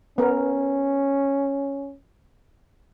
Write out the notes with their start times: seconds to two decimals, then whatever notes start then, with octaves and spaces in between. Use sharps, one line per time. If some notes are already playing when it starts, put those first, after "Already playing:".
0.18 B3 C#4 A#4